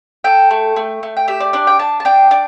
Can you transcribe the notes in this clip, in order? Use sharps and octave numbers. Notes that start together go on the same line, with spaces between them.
A4 G5
A3
A3
A3
G5
G4 E5
D5
D4 D5
G5
D4 A5
A5
D4 G5
D4